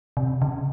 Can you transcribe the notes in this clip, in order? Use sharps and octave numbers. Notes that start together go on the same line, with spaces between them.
C3
C#3